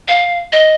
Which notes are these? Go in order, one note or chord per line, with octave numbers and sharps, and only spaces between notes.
F5
D#5